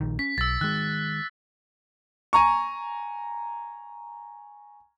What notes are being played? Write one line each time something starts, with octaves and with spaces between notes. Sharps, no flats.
A#1 D#3
C#4 B6
B1 E6 A6
D#3 G#3 F#6
G#5 A#5 C#6